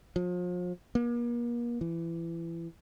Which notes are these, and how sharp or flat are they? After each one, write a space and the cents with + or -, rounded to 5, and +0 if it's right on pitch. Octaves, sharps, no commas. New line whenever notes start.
F3 +35
A#3 +40
E3 +25